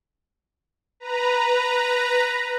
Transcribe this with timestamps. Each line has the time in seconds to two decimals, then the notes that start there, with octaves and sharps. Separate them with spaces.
1.00 B4 A#5